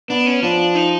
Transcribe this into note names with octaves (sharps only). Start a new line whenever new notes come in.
B3 D4
C#4
F3 D4
D#4